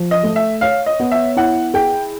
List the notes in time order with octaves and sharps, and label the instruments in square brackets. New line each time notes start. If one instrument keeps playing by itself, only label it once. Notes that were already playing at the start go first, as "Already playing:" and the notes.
Already playing: [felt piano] F3
[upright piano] D#5
[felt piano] A3
[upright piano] E5
[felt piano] C#5 [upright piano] F5
[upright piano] D#5
[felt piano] B3
[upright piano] E5
[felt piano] E4 [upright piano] F#5
[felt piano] G#4 [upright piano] G5